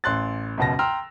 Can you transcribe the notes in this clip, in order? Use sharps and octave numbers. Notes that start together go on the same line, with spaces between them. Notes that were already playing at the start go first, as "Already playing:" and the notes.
A1 C6 F#6 A6
C#2 F#2 B2 A5 A#6
G5 A#5 C6 E6 F6